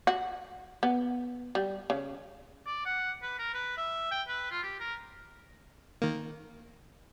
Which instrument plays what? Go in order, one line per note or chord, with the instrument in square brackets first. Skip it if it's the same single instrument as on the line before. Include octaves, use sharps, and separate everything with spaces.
[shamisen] F#4
B3
G3
C#3
[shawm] D5
F#5
B4
A#4
B4
E5
G5
B4
F4
G4
A#4
[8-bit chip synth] D#3 A#3